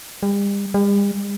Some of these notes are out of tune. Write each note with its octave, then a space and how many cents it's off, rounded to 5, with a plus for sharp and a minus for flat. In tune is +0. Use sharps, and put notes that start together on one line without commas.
G3 +40
G3 +45